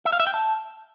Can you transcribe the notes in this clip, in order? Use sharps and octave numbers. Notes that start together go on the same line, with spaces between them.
E5
F5
E5
G5
A5